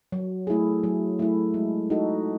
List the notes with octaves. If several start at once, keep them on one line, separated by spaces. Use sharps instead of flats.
F#3
A3 E4 G#4
F#3
A3 E4
G#3
D#4 F#4 A4